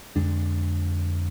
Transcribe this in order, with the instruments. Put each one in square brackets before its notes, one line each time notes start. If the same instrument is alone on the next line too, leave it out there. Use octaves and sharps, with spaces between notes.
[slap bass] F2 D3 G#3 D4